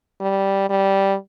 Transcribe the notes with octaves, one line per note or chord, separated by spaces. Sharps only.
G3
G3